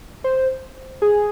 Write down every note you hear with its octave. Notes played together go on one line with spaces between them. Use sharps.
C5
G#4